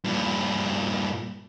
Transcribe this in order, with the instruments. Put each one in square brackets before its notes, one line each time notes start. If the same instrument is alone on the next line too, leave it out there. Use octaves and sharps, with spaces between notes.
[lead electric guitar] G2 A#2